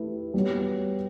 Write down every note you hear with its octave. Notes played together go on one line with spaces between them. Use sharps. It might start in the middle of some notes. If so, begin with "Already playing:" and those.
Already playing: A3 E4 G4 B4
G3 B3 F#4 C#5